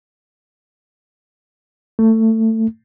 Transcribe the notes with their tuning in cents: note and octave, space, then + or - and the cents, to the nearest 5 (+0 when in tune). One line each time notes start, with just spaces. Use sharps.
A3 +20